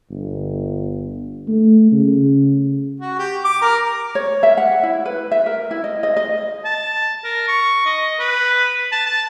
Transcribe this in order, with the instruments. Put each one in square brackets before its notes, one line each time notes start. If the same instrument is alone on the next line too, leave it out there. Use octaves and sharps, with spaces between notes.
[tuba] G1
A3
C#3
[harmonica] F#4
G4
D6
A#4
[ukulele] C#5
E5
F#5
E4
B4
E5
A#4
E4
D#5
D#5
D#5
[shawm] A5
A#4
C#6
D#5
B4
A5
A5